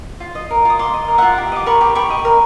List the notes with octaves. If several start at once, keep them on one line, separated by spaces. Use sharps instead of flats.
F4
D#5
A#4
F4 D#6
F4 C6 D6
D#5
A#4
F4 E5 F#5
G4
D#5 D6
A#4 B5 C#6
G4
G4 B5 C#6
D#5
A#4